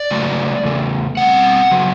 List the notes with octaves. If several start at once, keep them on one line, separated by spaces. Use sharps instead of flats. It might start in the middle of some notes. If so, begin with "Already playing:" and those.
Already playing: D5
C#3 F#3 A3
E2 C#3 A3
B2 G3 C4 F#5
C#3 F#3 B3